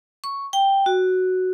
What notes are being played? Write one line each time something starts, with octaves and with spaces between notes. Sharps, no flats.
C#6
G5
F#4